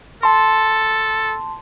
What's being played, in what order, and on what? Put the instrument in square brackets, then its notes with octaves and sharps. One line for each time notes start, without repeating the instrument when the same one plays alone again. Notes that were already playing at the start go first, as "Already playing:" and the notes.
[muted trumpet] A4 [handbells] A5 C6